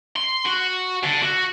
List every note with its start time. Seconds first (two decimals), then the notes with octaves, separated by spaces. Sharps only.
0.16 C6
0.46 F#4
1.04 D3
1.23 F#4